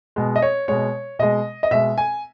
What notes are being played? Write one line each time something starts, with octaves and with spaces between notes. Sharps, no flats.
B2 G#3
D#5
C#5
B2 G#3 C#5
B2 G#3 D#5
D#5
B2 G#3 E5
G#5